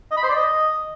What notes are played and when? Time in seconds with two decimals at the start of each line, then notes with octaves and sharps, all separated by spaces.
0.11 D#5
0.17 B5
0.23 C5
0.29 D5
0.35 D#5